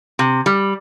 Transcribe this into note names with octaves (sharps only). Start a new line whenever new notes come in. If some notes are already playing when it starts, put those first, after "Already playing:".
C3
G3